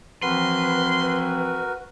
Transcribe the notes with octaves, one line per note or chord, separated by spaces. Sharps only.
E3 F3 C4 F#4 A#4 B4 C6